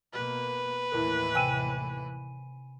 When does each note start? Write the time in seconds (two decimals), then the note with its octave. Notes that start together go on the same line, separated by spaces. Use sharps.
0.13 B2 A#3 B4
0.92 D#2 A2 E3 E4 A#4
1.35 C3 G5 G#5 D#7